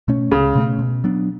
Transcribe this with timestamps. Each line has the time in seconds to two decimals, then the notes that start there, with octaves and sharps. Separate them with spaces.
0.08 B2 A3 C#4
0.31 C#2 C#3
0.55 B2 A3 C#4
0.79 B2
1.04 F#3 B3 D4